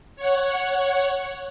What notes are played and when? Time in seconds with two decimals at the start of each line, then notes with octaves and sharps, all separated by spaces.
0.16 C#5 F#5